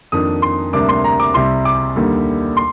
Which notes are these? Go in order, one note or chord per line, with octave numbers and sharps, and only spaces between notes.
F2 D#3 A#3 D4 D#6
C6
D2 C3 G3 A#3 D4 D6
C6
A#5
D6
C2 C3 G3 C6
D6
D#2 D3 G3 A#3
C6